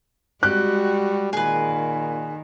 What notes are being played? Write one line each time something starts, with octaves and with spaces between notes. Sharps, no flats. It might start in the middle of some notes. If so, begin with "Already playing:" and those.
G3 G#3 F#4 G4 F#6
A#2 D#3 G#4 B4